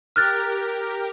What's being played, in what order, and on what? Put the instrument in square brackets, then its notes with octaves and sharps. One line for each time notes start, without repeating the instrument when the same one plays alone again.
[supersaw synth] G4 A#4 [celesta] F6 F#6 A6